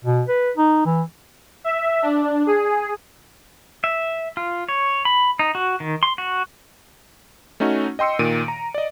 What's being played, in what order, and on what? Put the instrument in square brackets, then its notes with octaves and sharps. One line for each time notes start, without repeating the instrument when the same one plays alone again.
[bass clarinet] B2
B4
D#4
E3
[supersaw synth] E5
D4
G#4
[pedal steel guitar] E5
F4
C#5
B5
D#4
F#4
D#3
C6
F#4
[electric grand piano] A3 C#4 D#4 F#4
D#5 G5 C6 E6 C#7
A#2 D#3 D7 D#7
A#5
D5 D#5